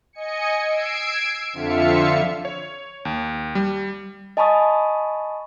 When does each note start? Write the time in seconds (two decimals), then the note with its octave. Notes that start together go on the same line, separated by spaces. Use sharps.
0.13 D#5 G#5 C#7
0.66 E6 G#6 C7 D7
1.53 F2 D3 F4 E5 F5 C#7
2.45 C#5
3.05 D#2
3.55 G3
4.37 D#5 G#5 A5 B5 C#6 D#6